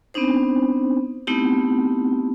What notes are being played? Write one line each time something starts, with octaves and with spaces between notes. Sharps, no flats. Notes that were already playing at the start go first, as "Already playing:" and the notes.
B3 C4 D4 D#4 C5
A3 B3 C4 D#4 E4 G4